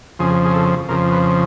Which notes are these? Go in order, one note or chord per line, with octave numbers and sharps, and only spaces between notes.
F2 C#3 F3 G#4
G#4
A4
F2 C#3 F3 A#4
B4